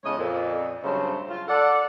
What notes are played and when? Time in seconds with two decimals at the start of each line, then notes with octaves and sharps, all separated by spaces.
0.04 E2 C#3 G#3 A3 C#5 D#5
0.18 F2 A#2
0.84 G2 C#3 F#3 A3 C4 C5
1.30 F4
1.48 A4 D5 F#5